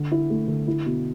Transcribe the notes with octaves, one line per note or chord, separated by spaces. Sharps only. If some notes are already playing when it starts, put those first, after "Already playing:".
Already playing: D3
E4
A3
D3
E4
B2